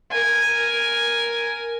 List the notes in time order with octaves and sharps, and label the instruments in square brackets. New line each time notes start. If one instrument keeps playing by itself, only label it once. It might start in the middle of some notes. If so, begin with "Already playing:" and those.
[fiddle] A#4 G#5